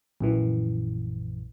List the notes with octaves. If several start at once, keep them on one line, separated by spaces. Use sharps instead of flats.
A#1 F#2 E3